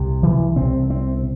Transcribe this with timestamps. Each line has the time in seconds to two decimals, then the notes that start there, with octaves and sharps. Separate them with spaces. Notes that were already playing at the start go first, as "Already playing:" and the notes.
Already playing: C2 C3
0.23 E3
0.56 C2 C3 C4
0.90 C4